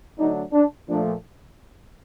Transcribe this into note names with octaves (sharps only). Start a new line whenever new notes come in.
D3 F#3 A3 D4 D#4
D4
A#2 F3 A3 D4